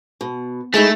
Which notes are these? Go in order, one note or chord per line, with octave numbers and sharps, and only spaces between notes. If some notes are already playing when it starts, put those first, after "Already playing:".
B2
G#3 A3 D#4 E4